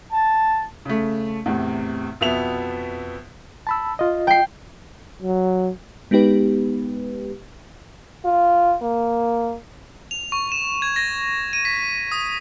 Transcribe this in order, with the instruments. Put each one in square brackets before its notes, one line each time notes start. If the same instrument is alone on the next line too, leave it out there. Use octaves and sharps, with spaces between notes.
[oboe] A5
[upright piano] C#3 A3
E2 A2 C3
F2 B2 B3 E5 F7
[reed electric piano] A5 B5 E6
F4 D#5
[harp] G5 C7
[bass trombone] F#3
[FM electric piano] G#3 B3 D#4 G4 B4
[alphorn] F4
A#3
[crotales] F7
C#6
E7
G#6
A#6
D#7
B6
D#6